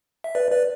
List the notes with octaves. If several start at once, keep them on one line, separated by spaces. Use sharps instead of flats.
E5
B4 D5
B4 D5